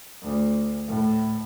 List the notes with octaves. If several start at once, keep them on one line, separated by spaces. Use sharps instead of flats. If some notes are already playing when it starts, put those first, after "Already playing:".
D2
A2